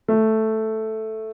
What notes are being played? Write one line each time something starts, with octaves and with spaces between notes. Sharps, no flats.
A3